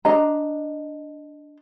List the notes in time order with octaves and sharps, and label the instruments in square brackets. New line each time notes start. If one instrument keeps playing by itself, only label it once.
[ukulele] D4 D#5 A#5